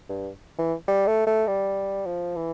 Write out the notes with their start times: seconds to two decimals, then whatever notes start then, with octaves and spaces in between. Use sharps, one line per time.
0.09 G2
0.58 E3
0.88 G3
1.07 A3
1.27 A3
1.47 G3
2.06 F3
2.36 E3